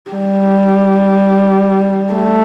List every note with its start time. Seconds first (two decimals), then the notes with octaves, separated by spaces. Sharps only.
0.11 G3
2.13 A3